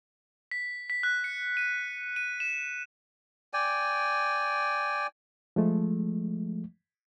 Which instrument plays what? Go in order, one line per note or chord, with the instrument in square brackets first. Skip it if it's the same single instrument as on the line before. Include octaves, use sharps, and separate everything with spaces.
[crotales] B6
B6
F#6
C#7
D#7
D#7
E7
[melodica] D5 G5 G#5
[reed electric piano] F3 G#3 A3